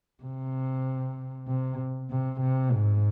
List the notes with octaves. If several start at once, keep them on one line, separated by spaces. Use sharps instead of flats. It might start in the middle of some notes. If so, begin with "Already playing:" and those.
C3
C3
C3
C3
G#2